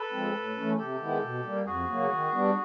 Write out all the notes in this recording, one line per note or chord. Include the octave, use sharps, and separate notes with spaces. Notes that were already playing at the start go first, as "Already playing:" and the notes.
Already playing: A4 B4
F3 G#3 C4
A2
E3 A3 C#4
C3 G4 A4
D#3 G#3 B3 E4
B2
G3 A#3
F2 F#4 G#4
C#3 F#3 A#3
D#3
G3 B3 D4